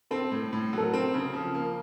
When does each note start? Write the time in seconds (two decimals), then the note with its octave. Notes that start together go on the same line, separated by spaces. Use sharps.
0.11 C4 A4
0.32 A2
0.53 A2
0.73 F#3 A4
0.83 A#4
0.94 C4
1.14 C#3
1.33 F3
1.54 A#3